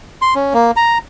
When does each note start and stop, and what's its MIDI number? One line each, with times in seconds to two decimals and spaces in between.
0.22 0.34 84
0.35 0.53 61
0.54 0.71 58
0.76 0.98 82